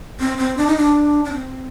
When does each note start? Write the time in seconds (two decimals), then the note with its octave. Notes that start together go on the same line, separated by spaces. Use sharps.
0.20 C4
0.38 C4
0.57 D4
0.67 D#4
0.77 D4
1.25 D4
1.33 C4